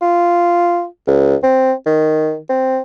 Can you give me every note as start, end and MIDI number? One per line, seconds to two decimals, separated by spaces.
0.02 0.85 65
1.07 1.36 37
1.43 1.73 60
1.86 2.37 51
2.49 2.80 60